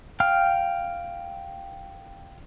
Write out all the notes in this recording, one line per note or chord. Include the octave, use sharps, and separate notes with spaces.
F5 G5 F6